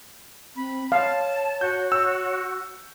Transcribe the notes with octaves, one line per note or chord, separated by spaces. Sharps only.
C4 B5
C#5 F5 A5
F#4 G6
E6